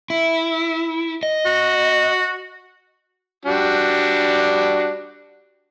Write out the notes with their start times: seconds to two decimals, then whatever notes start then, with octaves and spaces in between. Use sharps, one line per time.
0.10 E4
1.23 D#5
1.46 F#4
3.46 G3 D4 F#4